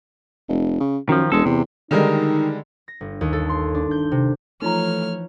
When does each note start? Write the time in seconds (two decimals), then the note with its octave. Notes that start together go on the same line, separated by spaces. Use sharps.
0.48 F1
0.80 C#3
1.09 F#2 D#3 F3
1.32 E1 G#3 A4
1.45 E2 C3
1.91 D3 D#3 G3 G#3 D#4 A#4
2.88 A#6
3.01 G1
3.21 D#2
3.33 A4
3.49 C6
3.75 D4
3.91 G6
4.11 C3
4.62 E3 F3 A3 D#4 F4 C#5 A#5 F6